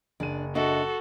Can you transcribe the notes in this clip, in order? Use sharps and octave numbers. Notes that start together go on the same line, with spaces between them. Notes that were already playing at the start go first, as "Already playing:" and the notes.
F#1 D4 D#7
D4 F#4 A4 D#5 E5